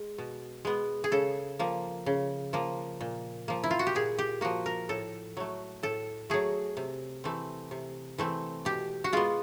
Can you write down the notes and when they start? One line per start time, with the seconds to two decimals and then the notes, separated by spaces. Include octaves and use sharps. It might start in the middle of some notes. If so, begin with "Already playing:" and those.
Already playing: G#3
0.18 B2
0.65 G#3 B3
1.04 G#4
1.12 C#3 A4
1.59 F3 A#3
2.06 C#3
2.53 F3 A#3
3.01 A#2
3.48 F3 A#3
3.64 E4
3.71 F4
3.79 F#4
3.87 G4
3.95 A#2 G#4
4.19 G4
4.41 F3 A#3 F#4
4.66 A#4
4.89 A2 A4
5.37 F#3 A3
5.83 A2 A4
6.30 F#3 A3 G#4
6.77 C3
7.24 E3 A3 C4
7.71 C3
8.18 E3 A3 C4
8.65 B2 G4
9.04 F#4
9.13 G#3 B3 F4